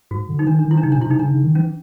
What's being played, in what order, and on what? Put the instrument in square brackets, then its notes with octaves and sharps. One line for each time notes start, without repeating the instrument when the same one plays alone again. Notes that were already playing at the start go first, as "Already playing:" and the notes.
[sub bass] G#2 [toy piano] F#4
[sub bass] D3
[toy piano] D#4
[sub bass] D#3 [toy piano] D4
[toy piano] D4
[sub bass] D#3
[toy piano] E4
D4
[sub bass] C#3 [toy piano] D#4
[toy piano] D4
[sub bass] B2
[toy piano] E4
[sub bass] C3
[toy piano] D#4
[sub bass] C#3 [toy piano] D4
[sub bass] C#3
D#3
[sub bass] E3 [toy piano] C#4